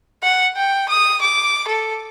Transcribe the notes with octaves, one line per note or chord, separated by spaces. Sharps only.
F#5
G5
D#6
D6
A4